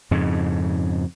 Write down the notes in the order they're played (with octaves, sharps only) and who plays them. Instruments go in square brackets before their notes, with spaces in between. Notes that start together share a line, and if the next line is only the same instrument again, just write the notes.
[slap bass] F2 G#2 C#3